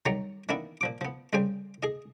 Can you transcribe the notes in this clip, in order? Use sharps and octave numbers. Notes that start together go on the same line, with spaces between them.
C2 D#3 F#3 C#5 D5 A#5
D#3 E3 A#3 B3 D4 E4
A#2 F3 D6
F3 B3
C2 C#3 G3 C5 G#5
G#4 D#5